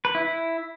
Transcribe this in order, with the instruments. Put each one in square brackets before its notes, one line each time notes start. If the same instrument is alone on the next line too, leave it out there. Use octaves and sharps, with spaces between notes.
[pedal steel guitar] B4
E4
E4